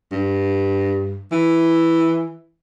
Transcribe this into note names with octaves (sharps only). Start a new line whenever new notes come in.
G2
E3